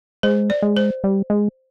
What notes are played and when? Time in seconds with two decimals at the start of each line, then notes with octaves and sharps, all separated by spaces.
0.23 G#3 C5
0.50 D5
0.62 G#3
0.77 C5
1.04 G3
1.30 G#3